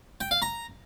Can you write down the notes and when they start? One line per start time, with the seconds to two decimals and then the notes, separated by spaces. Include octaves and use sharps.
0.21 G5
0.31 F5
0.42 A#5